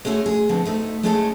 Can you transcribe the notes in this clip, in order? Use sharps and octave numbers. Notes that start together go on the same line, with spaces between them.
G#3 A3 C#4 E4 F#4
G#4
B2 D3 F3 G#3 C4
D2 A3 D#4
G#3 A3 C#4 D#4 E4 A4